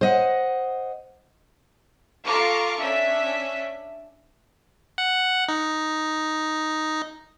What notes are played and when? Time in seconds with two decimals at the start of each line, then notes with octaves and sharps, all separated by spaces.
0.01 C5 D#5 F#5
2.23 F4 A4 F5 A#5 C#6 D6
2.79 C#4 D4 E5 B6
4.98 F#5
5.49 D#4